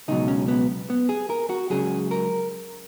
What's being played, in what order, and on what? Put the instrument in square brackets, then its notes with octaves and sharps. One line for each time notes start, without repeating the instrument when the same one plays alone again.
[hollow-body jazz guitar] C#2 B2 F#3 D#4
C#4
B3
B3
G#4
A#4
F#4
C#2 C#3 F#3 G#4
A#4